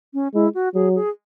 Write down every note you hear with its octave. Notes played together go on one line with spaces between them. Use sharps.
C#4
G#3 E4
F#4
F#3 G#4
G#4